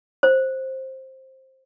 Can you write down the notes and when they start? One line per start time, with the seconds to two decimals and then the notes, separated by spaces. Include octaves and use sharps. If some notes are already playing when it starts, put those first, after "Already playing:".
0.23 C5